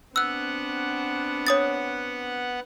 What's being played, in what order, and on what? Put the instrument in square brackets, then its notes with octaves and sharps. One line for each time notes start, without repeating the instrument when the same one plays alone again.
[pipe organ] B3 F#5 [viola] C4 D4 [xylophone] E6 F#6
[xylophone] C#5 D#6 A6